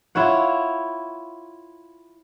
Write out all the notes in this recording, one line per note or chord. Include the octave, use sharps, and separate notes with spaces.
E4 F4 C#5 F#5